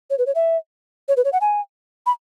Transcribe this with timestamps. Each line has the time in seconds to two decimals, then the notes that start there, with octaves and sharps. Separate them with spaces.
0.10 C#5
0.18 B4
0.26 C#5
0.35 E5
1.08 C#5
1.17 B4
1.25 C#5
1.33 F#5
1.41 G#5
2.06 B5